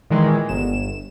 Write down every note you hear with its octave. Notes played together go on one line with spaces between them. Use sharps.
A#2 D#3 E3 G#3
G1 E7